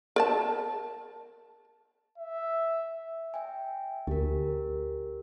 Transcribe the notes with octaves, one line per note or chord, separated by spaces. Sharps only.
A#4 D5 A5
E5
E5 G5 G#5
D2 G4 A#4